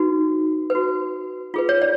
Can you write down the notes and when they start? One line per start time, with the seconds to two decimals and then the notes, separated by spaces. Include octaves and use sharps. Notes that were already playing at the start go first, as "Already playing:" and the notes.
Already playing: D#4 F#4 B4
0.70 F#4 B4
1.54 F4 G#4 B4
1.69 C#5
1.82 D5